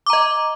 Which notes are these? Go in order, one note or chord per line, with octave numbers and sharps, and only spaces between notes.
D#5 A#5 D6